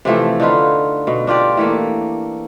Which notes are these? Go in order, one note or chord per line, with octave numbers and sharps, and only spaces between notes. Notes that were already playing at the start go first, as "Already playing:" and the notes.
C3 E3 F3 A3
D3 D#4 F4 B4
B2
D4 F4 G4 D5
E3 A3 A#3